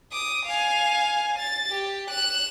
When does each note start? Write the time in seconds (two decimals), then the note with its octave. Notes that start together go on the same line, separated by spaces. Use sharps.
0.12 D6 D#6
0.46 F5 G#5
1.38 A6
1.70 G4
2.11 F#6 E7